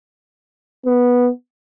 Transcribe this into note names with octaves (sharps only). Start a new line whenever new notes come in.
B3